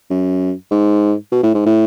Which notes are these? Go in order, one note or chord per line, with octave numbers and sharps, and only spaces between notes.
F#2
G#2
B2
A2
G#2
A2